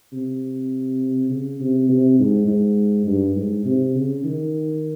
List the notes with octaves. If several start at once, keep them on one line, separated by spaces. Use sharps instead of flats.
C3
C#3
C3
C3
G#2
G#2
G2
G#2
C3
C#3
D#3